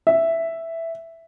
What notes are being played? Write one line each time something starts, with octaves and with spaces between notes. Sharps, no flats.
E5